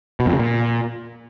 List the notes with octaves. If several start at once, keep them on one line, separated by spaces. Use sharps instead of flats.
B2
F2
C#3
A#2